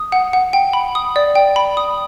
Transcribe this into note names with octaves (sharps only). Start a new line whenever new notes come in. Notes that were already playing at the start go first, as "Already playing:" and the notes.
Already playing: D#6
F#5
F#5
G5
B5
D#6
D5
G5
B5
D#6